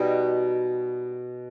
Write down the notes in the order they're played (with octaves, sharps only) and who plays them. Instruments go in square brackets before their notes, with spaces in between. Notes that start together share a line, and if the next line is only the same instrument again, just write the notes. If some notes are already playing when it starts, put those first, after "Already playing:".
Already playing: [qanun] B2 G3 D#4 F#4